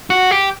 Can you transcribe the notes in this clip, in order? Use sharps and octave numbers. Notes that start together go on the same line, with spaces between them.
F#4
G4